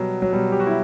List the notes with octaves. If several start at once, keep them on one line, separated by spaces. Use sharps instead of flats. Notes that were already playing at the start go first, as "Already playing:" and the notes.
Already playing: B2 F#3 G3
F#3
B2 G3
G4
F#4
E4